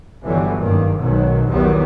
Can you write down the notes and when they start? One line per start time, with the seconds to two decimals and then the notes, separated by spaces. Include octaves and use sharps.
0.23 G1 D3 E3 F#3 G3
0.58 F#1 G2 D#3 A#3
0.97 B1 G#2 B2 D#3 F#3
1.49 B1 E2 D#3 F#3 G3 B3